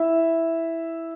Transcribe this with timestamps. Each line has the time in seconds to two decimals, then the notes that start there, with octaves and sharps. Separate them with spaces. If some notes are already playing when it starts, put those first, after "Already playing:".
Already playing: E4 E5